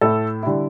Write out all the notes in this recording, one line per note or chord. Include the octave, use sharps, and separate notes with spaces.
A2 A3 E4 A4
D3 G3 E4